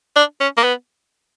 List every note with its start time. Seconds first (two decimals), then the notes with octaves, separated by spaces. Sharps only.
0.16 D4
0.41 C#4
0.57 A#3
0.64 B3